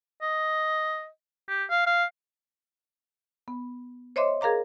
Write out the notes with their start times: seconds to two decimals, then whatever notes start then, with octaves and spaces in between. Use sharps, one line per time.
0.22 D#5
1.49 G4
1.70 F5
1.87 F5
3.48 B3
4.16 C5 C#5 D#5 E5 C6 D6
4.41 G#4 A#4 F5 A#5 D6